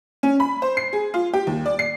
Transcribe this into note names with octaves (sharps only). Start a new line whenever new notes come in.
C#4
B5
C5
C7
G#4
F4
G4
D#2
D5
C7